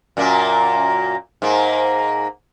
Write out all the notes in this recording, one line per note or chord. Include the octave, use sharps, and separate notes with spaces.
F#2 A#2 A#3
G#2 A#3